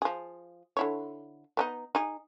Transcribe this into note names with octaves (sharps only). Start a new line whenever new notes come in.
F3 G#4
D3 E4 C#5
B3 D4 D#4
D#4 G#4